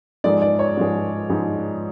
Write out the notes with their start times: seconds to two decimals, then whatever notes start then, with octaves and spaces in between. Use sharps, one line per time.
0.24 G#2 F3 G#3 D5
0.42 D5
0.59 C#5
0.77 G#2 F3 G#3
1.29 G#2 F3 G#3